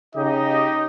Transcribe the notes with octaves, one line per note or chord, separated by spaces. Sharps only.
C#3 D#4 G4 D#5